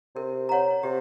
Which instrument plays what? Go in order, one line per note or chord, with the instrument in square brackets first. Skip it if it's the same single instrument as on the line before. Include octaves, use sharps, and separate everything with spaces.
[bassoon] C3 [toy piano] A#4
[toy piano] C#5 F#5 A#5
[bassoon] C3 [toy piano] G4